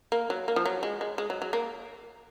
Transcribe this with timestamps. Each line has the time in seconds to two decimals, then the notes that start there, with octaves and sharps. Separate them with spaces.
0.12 A#3
0.30 F#3
0.48 A#3
0.56 F3
0.65 F#3
0.83 G#3
1.01 G#3
1.18 G#3
1.30 F#3
1.42 F#3
1.53 A#3